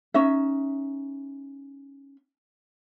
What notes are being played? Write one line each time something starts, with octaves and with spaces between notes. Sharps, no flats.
C#4 D#4 E5